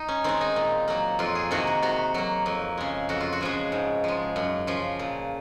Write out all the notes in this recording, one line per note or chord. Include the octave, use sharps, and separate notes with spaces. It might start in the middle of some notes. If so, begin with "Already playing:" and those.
Already playing: D#4
C#4
D#3 G#3 C4
D#4
A#2
F#3 A#3
F2 F4
G#4
C3 D#3 A#3 F#4
F#4
C3 F#4
F#3 A#3
F2
C#3 G#3
F2 F#4
F4
F#4
C#3 F3 G#3
G#2
F3 G#3
F#2
C#3 F3
A#2